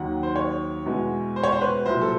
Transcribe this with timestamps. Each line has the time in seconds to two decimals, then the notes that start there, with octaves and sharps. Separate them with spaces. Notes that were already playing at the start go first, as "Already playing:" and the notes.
Already playing: D#2 D#3 F#3 F#5
0.23 C5
0.36 C#5
0.86 E2 B2 G#3
1.36 C5
1.44 C#5
1.52 C5
1.61 B4
1.86 C2 A#2 F#3 C5
2.02 A4